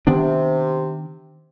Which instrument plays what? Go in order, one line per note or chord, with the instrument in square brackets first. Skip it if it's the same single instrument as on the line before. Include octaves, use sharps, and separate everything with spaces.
[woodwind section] C3 [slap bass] D#3 B3 D4